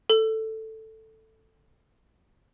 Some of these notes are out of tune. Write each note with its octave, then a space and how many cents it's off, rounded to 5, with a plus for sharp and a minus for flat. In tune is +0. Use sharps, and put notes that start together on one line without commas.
A4 +5